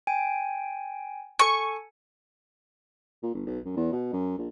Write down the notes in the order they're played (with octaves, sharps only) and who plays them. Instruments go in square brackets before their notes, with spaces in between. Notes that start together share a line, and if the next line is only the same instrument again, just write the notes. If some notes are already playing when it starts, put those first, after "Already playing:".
[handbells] G5 G#5 D7
[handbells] A4 G#5 [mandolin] C#6
[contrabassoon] A#2
G1
B1
F#2
E2
B2
F#2
A#1